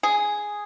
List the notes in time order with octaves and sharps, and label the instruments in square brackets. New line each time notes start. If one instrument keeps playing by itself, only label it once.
[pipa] G#4